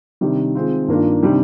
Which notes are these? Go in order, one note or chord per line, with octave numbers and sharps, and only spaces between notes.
C3 D#3 G3 D4
D#3 G#3 C4 F4
G2 D#3 A#3 D4 F4
C3 D#3 G3 D4